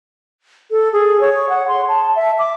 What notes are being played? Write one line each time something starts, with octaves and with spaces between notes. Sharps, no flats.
A4
G#4
C#5
F#5
C6
A5
E5
D6